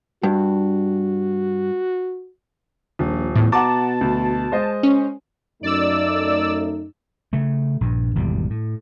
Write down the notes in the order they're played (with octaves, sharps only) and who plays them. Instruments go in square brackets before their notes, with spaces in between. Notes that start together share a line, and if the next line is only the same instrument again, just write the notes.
[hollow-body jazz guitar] G2 [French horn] F#4
[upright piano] D#1 [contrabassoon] A#1
[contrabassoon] E2 [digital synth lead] A2
[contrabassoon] B2 [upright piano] F#5 A#5 D6 [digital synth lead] A5
[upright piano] D2
G#3 C5 D#5
[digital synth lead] C#4
[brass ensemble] F#2 A3 D#4 [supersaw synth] D5 E6
[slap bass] C#3 A3
A#1 G2
G#1 E2 B2 G3
A2